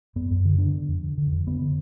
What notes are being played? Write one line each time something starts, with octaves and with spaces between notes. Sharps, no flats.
F#2 B3
F#2
D3
D3 D4
D3
F2
D3
D3
F2
D3 B3
D3